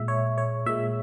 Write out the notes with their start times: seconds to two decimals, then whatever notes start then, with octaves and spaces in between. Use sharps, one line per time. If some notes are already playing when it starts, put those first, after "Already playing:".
Already playing: A#2 G#3 E5
0.08 C#5
0.38 C#5
0.66 A#2 G#3 E5